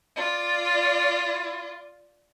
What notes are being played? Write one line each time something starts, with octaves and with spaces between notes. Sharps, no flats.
F4 D5